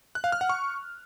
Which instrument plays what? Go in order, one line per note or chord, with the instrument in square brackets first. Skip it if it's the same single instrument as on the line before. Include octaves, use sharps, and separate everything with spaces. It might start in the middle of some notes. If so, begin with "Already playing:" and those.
[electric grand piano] F#6
F5
F6
F#5
C#6